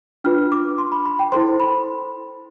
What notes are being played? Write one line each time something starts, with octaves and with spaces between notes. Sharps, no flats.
D4 F4 B4 F6
D6
C6
B5
B5
G5
E4 A4 C5 C6
B5